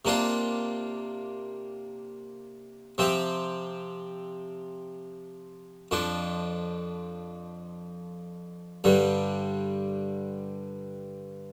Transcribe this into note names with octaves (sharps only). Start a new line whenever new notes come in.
C3 A#3 D4 F4
C3 F3 C4 G4
F2 F3 D4
G2 D3 G3